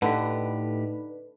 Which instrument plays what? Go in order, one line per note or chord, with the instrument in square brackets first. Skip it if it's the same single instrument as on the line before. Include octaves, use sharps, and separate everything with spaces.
[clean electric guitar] A2 A3 G4 [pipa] D3 [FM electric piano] D#4 B4